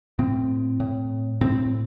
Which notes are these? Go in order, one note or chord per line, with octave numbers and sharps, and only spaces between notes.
A2 C4
A2
A2 C4